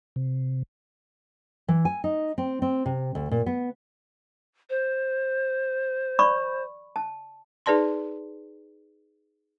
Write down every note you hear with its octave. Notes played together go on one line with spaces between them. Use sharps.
C3
E3
G#5
D#4
C4
C4
C3
D2
A#2
B3
C5
D5 B5 C#6
A5
D#4 G#4 B4 D5 A5 C6